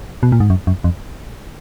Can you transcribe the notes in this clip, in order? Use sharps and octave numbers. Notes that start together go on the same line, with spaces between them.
B2
A#2
G#2
F#2
F#2
F2